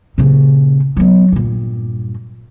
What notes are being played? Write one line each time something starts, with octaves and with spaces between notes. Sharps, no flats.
A#2 C#3
F#3 B3
G2 A#2